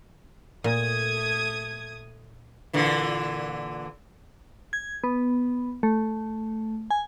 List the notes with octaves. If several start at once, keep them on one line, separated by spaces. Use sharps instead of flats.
A#2 A3 D#6 G#6
A#2 D3 E3
G#6
B3
A3
G#5